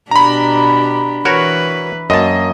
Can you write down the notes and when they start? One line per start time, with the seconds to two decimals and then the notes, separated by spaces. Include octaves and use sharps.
0.11 B2 D4 G4 A#5 B5
1.25 E3 F#4 A#4 B4 C#5
2.10 F#2 A#3 D#5 A5